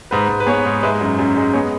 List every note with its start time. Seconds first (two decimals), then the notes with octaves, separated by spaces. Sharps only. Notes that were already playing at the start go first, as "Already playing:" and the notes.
0.11 G#2 B4
0.29 G#2
0.40 B4
0.47 B3 G#4 C#5
0.65 G#2
0.83 G#3 B4 E5
1.01 F#2
1.19 F#2
1.37 G#3
1.53 B3 G#4 C#5